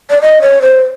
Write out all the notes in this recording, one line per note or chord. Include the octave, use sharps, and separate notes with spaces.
D5
D#5
C#5
C5